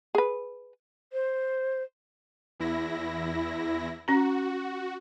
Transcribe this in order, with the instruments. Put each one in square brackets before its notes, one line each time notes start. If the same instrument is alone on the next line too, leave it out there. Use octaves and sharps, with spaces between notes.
[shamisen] G#4 B4
[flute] C5
[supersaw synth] E2 E4 A#6
[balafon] C#4 A#5 [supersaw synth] F#4